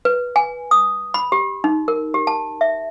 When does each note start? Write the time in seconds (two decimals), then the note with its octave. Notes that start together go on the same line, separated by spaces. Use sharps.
0.05 B4
0.36 G#5
0.71 D#6
1.14 B5
1.32 G4
1.64 D#4
1.88 A#4
2.14 G4
2.27 A5
2.61 E5